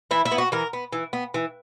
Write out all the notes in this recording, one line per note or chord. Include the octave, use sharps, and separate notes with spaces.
E3 E4
E4
B3
F#4
E3 A#4
B3
E3
B3
E3